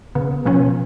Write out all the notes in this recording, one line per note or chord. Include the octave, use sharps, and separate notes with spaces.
C#3 B3
B2 F3 B3 C#4